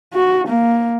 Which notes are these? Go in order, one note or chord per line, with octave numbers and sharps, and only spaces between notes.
F#4
A#3